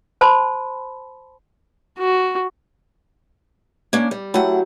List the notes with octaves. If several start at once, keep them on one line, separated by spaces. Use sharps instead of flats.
C5 A5 B5 C6
F#4
A#3 C#4 D4
G3
F#3 A3 E4 G4 F#5